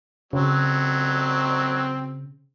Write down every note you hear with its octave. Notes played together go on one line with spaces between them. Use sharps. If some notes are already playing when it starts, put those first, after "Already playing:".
C#3 F#3 C4